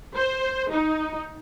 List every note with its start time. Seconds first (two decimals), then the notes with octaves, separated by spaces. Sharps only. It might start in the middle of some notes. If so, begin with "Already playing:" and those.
0.16 C5
0.71 D#4